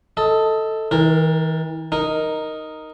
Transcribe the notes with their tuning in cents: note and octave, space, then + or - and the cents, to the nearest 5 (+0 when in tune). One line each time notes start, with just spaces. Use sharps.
A4 +5 D#5 +20
E3 -45 A#4 +0
D#4 +0 A#4 +0